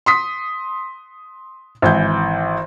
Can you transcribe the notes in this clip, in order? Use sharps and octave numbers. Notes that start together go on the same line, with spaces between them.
C6 D#6 B6
G#1 E3 G6